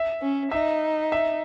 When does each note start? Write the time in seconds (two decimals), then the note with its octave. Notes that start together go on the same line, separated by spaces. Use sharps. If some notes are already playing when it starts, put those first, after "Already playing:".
Already playing: E5
0.22 C#4
0.51 D#4 E5
1.12 E5